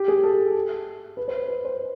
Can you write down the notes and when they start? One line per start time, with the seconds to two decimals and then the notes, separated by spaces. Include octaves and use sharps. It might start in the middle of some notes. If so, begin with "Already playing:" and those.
Already playing: G4
0.08 G#4
0.24 A4
1.17 B4
1.28 C5
1.48 B4
1.65 C5